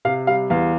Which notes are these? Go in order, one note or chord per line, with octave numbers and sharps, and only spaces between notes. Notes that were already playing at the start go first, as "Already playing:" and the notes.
C3 F5
G3 F5
E2 F5